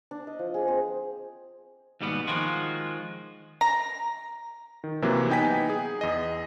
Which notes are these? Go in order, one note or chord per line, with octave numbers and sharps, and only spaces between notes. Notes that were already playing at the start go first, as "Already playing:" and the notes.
D4
D#5
F3
G#4
C4
D#2 G#2 B2 G3 B3
D#3 F3 G#3 F4 F#4
A#5
D#3
C3 E3 F#3 A#3
B3 D#4 G5 G#5 B6
G#4
E2 D#5